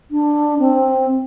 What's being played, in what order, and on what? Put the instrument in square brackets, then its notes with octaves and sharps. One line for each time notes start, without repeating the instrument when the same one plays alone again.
[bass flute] D4
C4